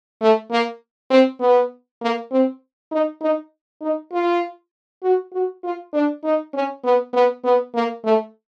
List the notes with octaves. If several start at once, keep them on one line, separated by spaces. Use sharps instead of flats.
A3
A#3
C4
B3
A#3
C4
D#4
D#4
D#4
F4
F#4
F#4
F4
D4
D#4
C#4
B3
B3
B3
A#3
A3